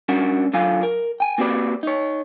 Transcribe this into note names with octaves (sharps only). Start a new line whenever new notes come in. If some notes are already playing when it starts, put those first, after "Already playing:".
G3 C#4 D4 F#4 A#4 D5
D3 F#3 F4 F5 G#5
A#4
G5 G#5
A#3 C4 F#4 G4 B4 D5
D#4 C#5